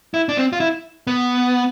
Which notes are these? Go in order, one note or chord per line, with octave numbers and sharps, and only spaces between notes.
E4
D4
C4
F4
E4
B3